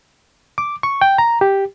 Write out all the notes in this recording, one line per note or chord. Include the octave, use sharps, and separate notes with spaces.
D6
C#6
G5
A#5
G4